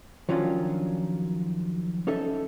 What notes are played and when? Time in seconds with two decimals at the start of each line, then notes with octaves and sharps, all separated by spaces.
0.29 D#3 F3 F#3 C#4 D4 F4
2.07 C#4 D#4 A4 E5